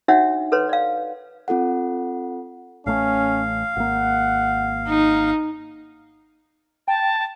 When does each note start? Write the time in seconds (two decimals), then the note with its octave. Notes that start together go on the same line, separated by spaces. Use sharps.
0.08 D4 D#4 F#4 C#5 E5 F#5
0.52 A4 B4 C#5 C6
0.69 D5 F5
1.48 C4 F4 A4 F#5
2.86 A1 A3 C#4 F5
3.76 G#1 A#3 F#5
4.88 D#4
6.88 G5 A5